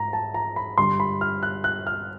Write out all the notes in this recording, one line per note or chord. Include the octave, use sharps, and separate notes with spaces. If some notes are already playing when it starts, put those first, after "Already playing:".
Already playing: G#2 A#5
A5
A#5
B5
G2 D3 G3 C6
B5
F6
F#6
F#6
F6